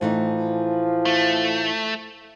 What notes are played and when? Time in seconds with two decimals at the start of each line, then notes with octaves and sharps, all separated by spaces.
0.01 A2 E3 F3 D#4
1.05 A3